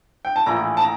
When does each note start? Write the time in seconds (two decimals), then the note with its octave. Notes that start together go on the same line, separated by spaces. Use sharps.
0.25 G5
0.36 A5
0.46 A#1 A2 E3 A#5
0.77 A5
0.81 A#5